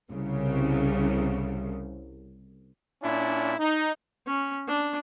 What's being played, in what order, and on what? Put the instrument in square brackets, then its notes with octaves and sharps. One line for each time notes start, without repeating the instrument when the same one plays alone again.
[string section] C2 C#3
[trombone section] A#2 C#4 D4 E4
D#4
[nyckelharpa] C#4
D4